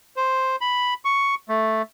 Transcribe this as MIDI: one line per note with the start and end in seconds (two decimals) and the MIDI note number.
0.16 0.56 72
0.61 0.94 83
1.05 1.35 85
1.49 1.82 57